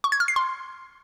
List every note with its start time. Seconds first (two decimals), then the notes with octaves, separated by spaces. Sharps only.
0.04 C#6
0.12 G#6
0.20 F6
0.28 C7
0.36 C6